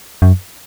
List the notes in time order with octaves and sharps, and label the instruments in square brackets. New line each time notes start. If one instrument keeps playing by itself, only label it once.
[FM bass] F#2